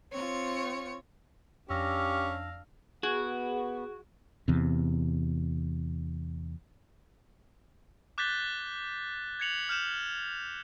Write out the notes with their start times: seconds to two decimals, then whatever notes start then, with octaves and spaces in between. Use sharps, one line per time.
0.13 C4 F4 C#5 C#7
1.70 F2 C#4 D4 G4 F5 E6 A#6
3.03 B3 F#4 G#4
4.48 E2 C3
8.18 D6 F#6 G6 A6 B6 G7
9.40 G#6 A#6 C#7 F7 F#7
9.69 F6 G6 E7 F7